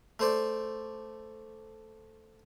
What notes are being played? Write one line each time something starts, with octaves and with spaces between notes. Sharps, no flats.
A3 C5 D5